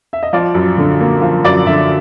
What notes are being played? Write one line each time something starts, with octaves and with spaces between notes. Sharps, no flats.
E5
D#5
F3 D5
F#2
D3
A#3
F3
F#2 D5
D3 E5